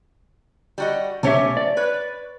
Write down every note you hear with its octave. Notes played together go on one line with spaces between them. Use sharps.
G3 F#4 D#5
B1 A3 C#4 G4 C#5 E5
D5
B4 C#5